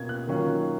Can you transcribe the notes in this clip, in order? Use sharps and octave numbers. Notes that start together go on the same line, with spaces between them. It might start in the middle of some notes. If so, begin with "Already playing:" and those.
Already playing: B2 A#3 C#4 F4 G#6
F#6
D#3 F#3 A#3 C#4 F4